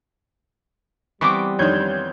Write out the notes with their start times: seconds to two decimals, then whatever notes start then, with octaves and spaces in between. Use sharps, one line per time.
1.21 E3 G3 B3 C4 C#6 D6
1.59 F2 D#3 D4 C#5 G6 G#6